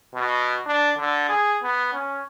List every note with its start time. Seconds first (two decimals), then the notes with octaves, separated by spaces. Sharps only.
0.14 B2
0.66 D4
0.98 D3
1.29 G#4
1.63 B3
1.93 C#4